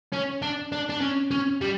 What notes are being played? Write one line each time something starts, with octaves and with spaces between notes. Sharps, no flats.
C#4
D4
D4
D4
C#4
C#4
G3